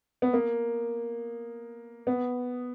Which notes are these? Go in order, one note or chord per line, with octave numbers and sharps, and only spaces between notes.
B3
A#3
B3